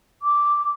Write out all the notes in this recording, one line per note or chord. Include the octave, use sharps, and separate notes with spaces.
D6